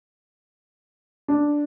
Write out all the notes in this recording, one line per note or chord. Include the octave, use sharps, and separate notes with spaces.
D4